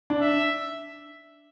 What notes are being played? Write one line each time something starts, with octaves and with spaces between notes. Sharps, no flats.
D4
E5